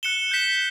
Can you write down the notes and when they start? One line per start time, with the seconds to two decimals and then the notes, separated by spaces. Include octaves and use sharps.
0.03 F#6 C#7 E7 G7
0.31 G6 B6 E7 G7